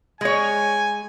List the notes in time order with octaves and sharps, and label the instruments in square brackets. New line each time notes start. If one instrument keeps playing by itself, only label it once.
[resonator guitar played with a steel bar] G#3 C#5 [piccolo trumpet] G#5